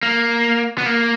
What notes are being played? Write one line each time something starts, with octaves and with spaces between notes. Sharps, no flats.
A#3
B3
A#3